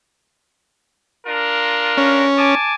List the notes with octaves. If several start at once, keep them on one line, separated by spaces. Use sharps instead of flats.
D4 F4 A#4
C#4
G#5 A5 D6